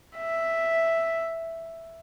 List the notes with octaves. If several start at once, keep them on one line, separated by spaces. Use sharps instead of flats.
E5